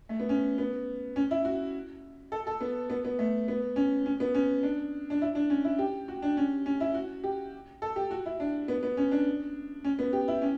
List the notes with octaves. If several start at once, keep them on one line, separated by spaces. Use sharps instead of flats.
A3
B3
C#4
B3
C#4
E4
F#4
A4
A4
B3
B3
B3
A3
B3
C#4
C#4
B3
C#4
D4
D4
E4
D4
C#4
E4
G4
F#4
D4
C#4
C#4
E4
F#4
G4
A4
G4
F#4
E4
D4
B3
B3
C#4
D4
C#4
B3
G4
E4
C#4